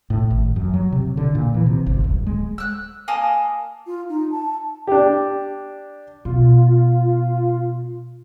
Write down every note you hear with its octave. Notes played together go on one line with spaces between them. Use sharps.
A2
G#1
F#2
F#3
C3
D3
A#2
E3
C3
G1
D1
G#3
E6 F#6
A#3 G#5 A5 D#6
F4
D#4
A5
D4 G4
B2 F4